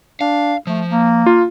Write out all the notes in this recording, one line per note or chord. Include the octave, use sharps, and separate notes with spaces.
D4 F5
F3 A3
A#3
F4